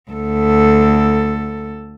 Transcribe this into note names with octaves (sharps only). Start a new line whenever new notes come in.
D2 A4